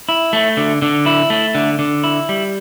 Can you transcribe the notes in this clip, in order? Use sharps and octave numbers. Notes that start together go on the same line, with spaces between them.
E4
A3
D3
D3
E4
A3
D3
D3
E4
G3